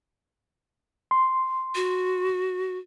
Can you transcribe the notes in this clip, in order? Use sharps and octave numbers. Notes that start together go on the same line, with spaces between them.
C6
F#4